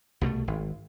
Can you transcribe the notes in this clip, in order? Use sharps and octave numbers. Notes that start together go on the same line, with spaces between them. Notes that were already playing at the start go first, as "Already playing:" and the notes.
C2 B2 F#3 A3
G#1